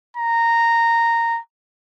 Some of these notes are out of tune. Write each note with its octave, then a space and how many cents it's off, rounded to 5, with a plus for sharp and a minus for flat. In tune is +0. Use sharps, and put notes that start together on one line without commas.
A#5 -10